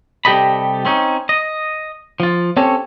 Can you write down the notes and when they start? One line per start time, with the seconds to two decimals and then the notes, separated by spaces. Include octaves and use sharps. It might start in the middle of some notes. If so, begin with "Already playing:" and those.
0.25 C3 G3 G4 A4 D#5 B5
0.85 C4 C#4 D#4
1.29 D#5
2.20 F3 F4
2.57 C4 C#4 G4 A4 C#5